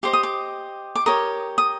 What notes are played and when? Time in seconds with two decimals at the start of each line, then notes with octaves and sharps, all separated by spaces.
0.03 G4 C5 D#5 D6
0.13 D#6
0.23 D6
0.95 D6
1.06 G4 A#4 C#5 D#6
1.58 D#6